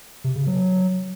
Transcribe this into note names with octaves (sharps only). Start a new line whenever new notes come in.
C3
C#3
F#3